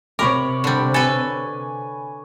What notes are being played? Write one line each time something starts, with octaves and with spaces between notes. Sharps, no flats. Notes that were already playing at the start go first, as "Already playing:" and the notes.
C3 A#4 C#5 B5 D6
D3 G3
A4 B4 G#5